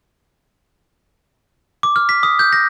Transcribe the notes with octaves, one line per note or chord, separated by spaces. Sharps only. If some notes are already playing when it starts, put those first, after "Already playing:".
D6
F6
B6
D#6
G6
A#6